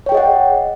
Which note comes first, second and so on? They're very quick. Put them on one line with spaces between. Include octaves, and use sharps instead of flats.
C#5 G5 G#4 D#5 F#5